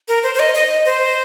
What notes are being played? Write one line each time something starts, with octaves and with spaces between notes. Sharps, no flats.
A#4
C5
C5
D#5
D#5
C5